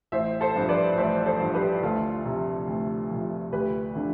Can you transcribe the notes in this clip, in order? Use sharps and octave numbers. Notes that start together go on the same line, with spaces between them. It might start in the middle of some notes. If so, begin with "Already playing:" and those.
A1 C5 E5
A4 C5
G2 F3
B4 D5
A1 C5 E5
A4 C5
G2 F3
G4 B4
D2 F4 A4
C3 F3
D2
C3 F3
D2 G4 B4
D3 F3